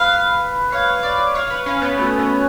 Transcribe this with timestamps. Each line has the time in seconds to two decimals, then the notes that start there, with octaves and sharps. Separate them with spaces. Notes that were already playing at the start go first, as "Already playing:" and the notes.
Already playing: B4 F5
0.72 C#5 F5
1.03 D5
1.35 C#5 F5
1.50 B4
1.66 C#4 F5
1.82 B3
1.98 A3 F#4
2.19 B3